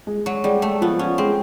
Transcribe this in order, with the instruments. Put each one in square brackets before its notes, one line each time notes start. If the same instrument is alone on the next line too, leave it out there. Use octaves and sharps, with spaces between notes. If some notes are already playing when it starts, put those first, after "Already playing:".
[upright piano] G#3
[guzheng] F#3
[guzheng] G3 [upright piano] G#3
[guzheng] A3
[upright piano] F3 [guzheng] B3
[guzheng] C#4
[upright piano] G#3 [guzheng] C4